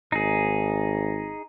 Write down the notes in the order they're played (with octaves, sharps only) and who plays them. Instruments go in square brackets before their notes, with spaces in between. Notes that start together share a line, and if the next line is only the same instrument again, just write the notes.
[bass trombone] G#1 [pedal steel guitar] D#4 G#4